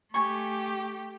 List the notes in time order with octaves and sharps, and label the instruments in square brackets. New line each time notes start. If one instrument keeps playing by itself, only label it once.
[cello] A3 G4 [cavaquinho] G#5 C#6